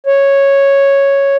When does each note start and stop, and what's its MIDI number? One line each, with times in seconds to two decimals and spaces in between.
0.07 1.36 73